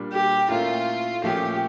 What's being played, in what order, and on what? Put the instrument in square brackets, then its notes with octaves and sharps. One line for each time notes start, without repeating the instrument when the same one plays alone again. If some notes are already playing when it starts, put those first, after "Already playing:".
Already playing: [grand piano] A#2 G3 D4
[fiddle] G4
[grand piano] A#2 A3 C#4 E4 A#4 [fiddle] F4
[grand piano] A#2 F3 A3 C#4 [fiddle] G4